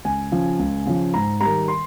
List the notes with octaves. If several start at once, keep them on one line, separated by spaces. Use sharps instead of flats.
C#2 G#5
C#3 F3
C#2
C#3 F3
G#2 A#5
D#3 G3 A#5
C6